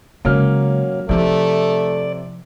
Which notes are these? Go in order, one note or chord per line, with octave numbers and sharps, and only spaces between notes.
C#3 F#3 G#3 A#3 C#4 F6
C3 F3 A3 E4 D5